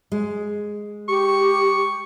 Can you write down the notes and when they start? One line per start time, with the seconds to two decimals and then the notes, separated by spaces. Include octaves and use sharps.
0.12 G#3
1.08 G4 C#6